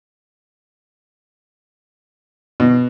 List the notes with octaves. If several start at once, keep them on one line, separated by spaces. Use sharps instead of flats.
B2